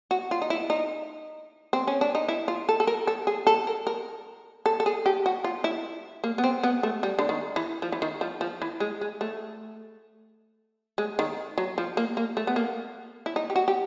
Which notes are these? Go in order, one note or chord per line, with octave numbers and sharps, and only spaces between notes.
F#4
F4
D#4
E4
D#4
C4
C#4
D4
D#4
E4
F4
A4
A4
A#4
A4
G#4
A4
A#4
A#4
A4
A4
G#4
G4
F#4
F4
E4
A#3
B3
C4
B3
A3
G3
D3
D#3
E3
F3
E3
D#3
F3
F3
E3
G#3
G#3
A3
G#3
D#3
F#3
F3
A#3
A#3
A3
B3
A#3
E4
D#4
G4
F#4
G4